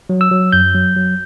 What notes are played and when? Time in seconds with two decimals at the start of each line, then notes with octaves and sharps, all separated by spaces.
0.09 F#3
0.21 E6
0.31 F#3
0.52 F#2 G6
0.74 F#3
0.96 F#3